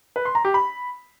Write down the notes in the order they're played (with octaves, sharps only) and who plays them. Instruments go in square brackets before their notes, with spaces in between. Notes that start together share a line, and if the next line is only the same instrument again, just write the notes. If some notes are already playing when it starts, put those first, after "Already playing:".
[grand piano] B4
C6
A#5
G4
B5